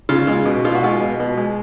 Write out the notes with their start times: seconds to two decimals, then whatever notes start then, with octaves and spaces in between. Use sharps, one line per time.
0.09 C#3 F4
0.27 G#3 F4
0.46 B2
0.64 B2 F4
0.75 F#4
0.83 G#3 F4
1.00 B2
1.20 B2
1.37 G#3